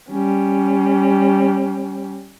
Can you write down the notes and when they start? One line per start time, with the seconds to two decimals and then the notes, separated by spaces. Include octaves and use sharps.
0.10 G3 C#4